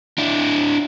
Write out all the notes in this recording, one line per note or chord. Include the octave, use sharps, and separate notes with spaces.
D4 E4